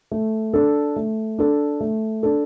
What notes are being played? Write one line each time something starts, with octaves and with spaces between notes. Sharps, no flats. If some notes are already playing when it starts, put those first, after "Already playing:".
A3
D4 A4
A3
D4 A4
A3
D4 A4